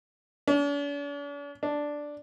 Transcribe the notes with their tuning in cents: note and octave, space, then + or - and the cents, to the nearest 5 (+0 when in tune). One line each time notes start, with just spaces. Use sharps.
D4 -45
D4 +0